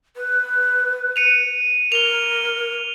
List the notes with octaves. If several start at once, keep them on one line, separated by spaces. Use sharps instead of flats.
B4
C#7 D#7 F7
A#4 F7 G7